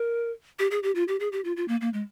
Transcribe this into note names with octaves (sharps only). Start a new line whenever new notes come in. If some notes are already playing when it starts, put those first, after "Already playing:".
Already playing: A#4
G4
G#4
G4
F4
G4
G#4
G4
F4
F4
A#3
A#3
G#3